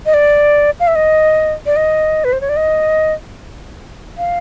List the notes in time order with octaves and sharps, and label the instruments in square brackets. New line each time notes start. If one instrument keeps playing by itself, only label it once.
[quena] D#5
D5
F5
E5
D#5
D5
D#5
B4
C5
C#5
D5
D#5
F5